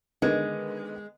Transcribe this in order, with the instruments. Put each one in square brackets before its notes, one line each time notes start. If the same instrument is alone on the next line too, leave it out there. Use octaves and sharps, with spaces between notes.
[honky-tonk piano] D3 D#3 B3 [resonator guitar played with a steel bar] G#3